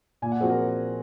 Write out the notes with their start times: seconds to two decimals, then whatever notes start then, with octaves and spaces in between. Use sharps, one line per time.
0.22 A#2 G#5
0.32 F#5
0.40 F3 C4 F#4 G#4
0.50 A#4